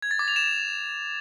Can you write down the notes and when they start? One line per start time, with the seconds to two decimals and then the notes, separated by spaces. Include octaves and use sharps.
0.02 G#6
0.11 A6
0.19 D6
0.28 F7
0.36 E7